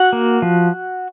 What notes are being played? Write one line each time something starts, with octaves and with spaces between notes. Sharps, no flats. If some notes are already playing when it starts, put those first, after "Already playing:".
Already playing: F#4 F#5
A#3
F3